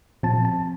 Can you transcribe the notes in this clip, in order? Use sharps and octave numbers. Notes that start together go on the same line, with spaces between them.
A#2 F3 C4 A5
A5